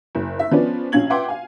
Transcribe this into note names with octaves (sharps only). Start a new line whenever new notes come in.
F#1
E5
F3 B3 C#4 B4 D5
A#1 C#4 F5 G#6 F#7
B4 E5 F#5 G5 C6 D6
F5 G#5